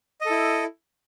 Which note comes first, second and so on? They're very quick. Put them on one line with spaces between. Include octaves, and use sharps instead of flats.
D#5 A4 E4